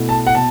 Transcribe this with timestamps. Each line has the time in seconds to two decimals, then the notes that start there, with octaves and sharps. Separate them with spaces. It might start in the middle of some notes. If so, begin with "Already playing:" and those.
Already playing: B2 A3 E4
0.09 A5
0.27 F#5
0.35 B2 A5